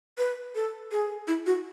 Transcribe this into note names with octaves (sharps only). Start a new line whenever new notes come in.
B4
A4
G#4
E4
F#4